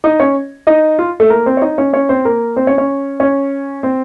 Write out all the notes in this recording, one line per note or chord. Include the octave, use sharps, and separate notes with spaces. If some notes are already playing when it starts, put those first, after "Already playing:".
D#4 D#5
C#4 C#5
D#4 D#5
F4
A3 A4
A#3 A#4
C4 C5
C#5
D#4 D#5
C#4 C#5
C#4 C#5
C4 C5
A#3 A#4
C4 C5
C#4 C#5
C#4 C#5
C#4 C#5
C4 C5